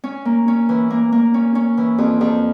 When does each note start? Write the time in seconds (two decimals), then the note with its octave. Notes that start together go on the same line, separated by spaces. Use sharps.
0.04 C#4
0.25 A#3
0.48 C#4
0.69 E3
0.91 A#3
1.12 A#3
1.34 C#4
1.55 C#4
1.77 E3
1.98 F2
2.21 F2